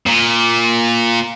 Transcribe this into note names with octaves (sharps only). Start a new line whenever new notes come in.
A#2